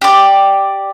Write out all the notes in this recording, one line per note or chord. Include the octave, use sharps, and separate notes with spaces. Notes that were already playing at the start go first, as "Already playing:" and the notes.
G4 D5